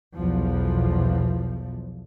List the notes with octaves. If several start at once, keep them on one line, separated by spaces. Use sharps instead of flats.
B1 E2 F3